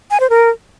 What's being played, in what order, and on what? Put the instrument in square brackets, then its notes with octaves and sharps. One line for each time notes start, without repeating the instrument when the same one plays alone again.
[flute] G#5
C5
A#4